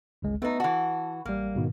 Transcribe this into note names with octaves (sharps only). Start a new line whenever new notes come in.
G1 C#2 G#3
A3 B3 D#4 B4
E3 F#4 A5
A1 G3 A#3
G#2 B2 D#3